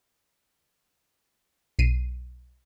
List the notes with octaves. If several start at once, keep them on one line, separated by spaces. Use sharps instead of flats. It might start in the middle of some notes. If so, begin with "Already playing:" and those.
B1 C7 D#7